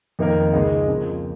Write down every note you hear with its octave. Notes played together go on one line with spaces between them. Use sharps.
F2 D#3 A#3 D#4 A#4
C#2 C#3 G#3 D#4 G#4
F2 C#3 F3 A#3